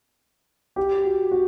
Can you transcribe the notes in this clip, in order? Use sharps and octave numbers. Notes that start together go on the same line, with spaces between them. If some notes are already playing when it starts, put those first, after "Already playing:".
G4
F#4
F#4